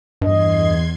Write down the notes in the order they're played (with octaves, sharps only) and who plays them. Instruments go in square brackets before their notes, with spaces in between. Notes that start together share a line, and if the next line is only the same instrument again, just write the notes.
[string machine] E2 C6 G#6 [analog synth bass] G2 [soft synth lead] D#5